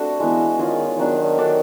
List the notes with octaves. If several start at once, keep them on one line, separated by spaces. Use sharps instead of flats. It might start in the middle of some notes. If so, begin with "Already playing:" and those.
Already playing: A3 C4 D4 F#4 A4
E3 G#3 B3 E4
D#3 C#4 F4 G#4
D#3 F#3 B3 D4
D4 F#4 A4 D5